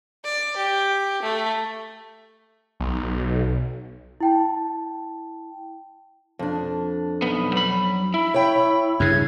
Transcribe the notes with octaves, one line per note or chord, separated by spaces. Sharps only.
D5
G4
A3
B1
E4 G5 A5
F2 D4
B1 B3
F#3 B5
E4 B5
C#5 G5
G2 C#3 G#6